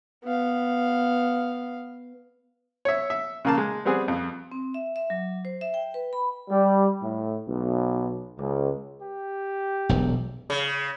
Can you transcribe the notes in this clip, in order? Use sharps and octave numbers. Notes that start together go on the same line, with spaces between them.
B3 F5
C#5 E5
E5
C#3 A#3 A5
G#3
G3 B3 C4 G#4
F2
C4
E5
E5
F#3
C5
E5
G5
B4
B5
G3
A2
B1
C#2
G4
E1 B1
C#3